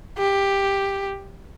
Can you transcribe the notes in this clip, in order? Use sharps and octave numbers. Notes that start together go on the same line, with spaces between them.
G4